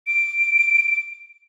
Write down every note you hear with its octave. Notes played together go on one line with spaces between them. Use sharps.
D7